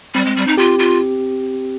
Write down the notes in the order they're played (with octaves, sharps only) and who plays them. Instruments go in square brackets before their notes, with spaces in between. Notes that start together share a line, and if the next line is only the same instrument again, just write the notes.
[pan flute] G3 [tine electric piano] C4
[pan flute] G#3
G3
D#4
[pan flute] F4 [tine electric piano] G4
[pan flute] F4